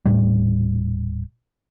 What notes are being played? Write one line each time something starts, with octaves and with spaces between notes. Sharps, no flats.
D#1 D#2 A2 G3